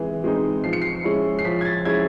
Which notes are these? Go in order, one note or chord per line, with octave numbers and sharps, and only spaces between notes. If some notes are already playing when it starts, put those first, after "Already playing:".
Already playing: E3 G#3 C4
G#3 C4 D#4
F3 C7
C#7
C7
G#3 C#4 E4
C7
F3 B6
G#6
A6
G#3 C#4 E4 G#6